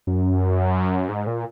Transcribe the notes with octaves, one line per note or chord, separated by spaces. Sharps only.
F#2
G#2
A#2